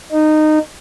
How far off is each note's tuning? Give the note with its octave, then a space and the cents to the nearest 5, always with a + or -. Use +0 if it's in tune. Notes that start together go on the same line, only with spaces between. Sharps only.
D#4 -15